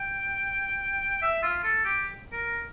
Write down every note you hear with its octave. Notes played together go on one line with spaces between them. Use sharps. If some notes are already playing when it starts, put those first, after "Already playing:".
Already playing: G5
E5
F4
A4
G4
A#4